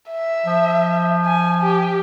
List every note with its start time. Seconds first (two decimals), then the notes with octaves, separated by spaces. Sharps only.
0.11 E5
0.46 F3
1.25 G#5
1.62 G4